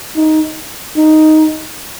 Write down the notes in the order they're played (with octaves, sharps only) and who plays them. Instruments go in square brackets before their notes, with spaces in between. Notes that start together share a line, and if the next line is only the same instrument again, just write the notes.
[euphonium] D#4
D#4